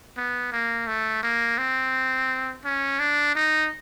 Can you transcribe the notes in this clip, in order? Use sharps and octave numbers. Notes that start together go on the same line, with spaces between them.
B3
A#3
A3
A#3
C4
C#4
D4
D#4